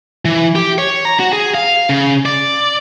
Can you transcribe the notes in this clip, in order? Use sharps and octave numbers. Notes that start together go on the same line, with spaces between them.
E3
G4
C#5
A#5
F#4
G#4
F5
C#3
D5